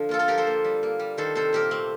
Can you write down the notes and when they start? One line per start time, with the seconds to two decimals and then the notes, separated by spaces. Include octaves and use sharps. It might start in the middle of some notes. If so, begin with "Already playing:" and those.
Already playing: D3 F3
0.09 A#3 F4 A4
0.19 F4 A4
0.28 F3 G4 A#4
0.38 A4 C5
0.47 A#3
0.64 G3
0.83 A#3
0.99 G3
1.18 D#3 A4 C5
1.35 C3 A4 C5
1.53 A#2 G4 A#4
1.71 A3 C4